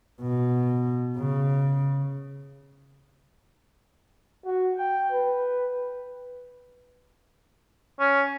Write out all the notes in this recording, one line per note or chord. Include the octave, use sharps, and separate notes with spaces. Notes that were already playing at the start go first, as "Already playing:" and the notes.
B2
C#3
F#4
G5
B4
C#4